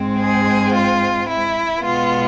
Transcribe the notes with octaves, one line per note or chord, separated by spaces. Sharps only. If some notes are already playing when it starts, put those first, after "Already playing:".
Already playing: G#2 G#3 C4
G#4
F4
E4
B2 G#3 B3 F4